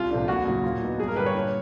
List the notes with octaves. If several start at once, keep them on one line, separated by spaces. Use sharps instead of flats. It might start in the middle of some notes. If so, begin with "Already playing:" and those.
Already playing: C2 F4
C3 F3 A3 D4
D#2 F#4
C#3 F#3
A#2
F#3 B3 D#4
G2 G#4
A#4
D3 G3 B4
C#5
A#2